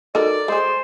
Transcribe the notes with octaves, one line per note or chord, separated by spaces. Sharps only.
D#4 F#4 A4 A#4 D5
G#3 G#4 C5